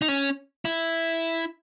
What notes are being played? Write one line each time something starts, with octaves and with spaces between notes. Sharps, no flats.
D#4
C#4
E4